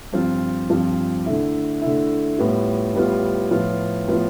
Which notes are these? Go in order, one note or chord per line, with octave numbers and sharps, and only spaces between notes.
G2 F3 C4 F4
G2 F3 C4 F4
D3 A3 E4
D3 A3 E4
A2 G3 B3 F4
A2 G3 B3 F4
A2 F3 B3 F4
A2 F3 B3 F4